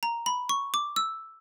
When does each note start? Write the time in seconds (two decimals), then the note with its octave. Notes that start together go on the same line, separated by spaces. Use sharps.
0.03 A#5
0.26 B5
0.49 C#6
0.74 D6
0.96 E6